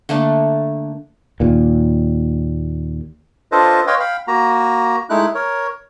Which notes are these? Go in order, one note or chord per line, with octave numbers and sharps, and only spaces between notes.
D3 A3 A#3 D4
D#2 A#2
D4 F4 A4 B4 C5 D#5
B4 C#5 D#5 F5 G5 C6
F5 G5 B5
A#3 F#4 A#5
G#3 A3 D#4 E4 F#6
A#4 C#5